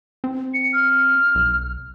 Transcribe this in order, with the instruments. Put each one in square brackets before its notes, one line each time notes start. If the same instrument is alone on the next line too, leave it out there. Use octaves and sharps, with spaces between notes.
[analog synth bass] C4
[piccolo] C#7
F6
[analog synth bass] B1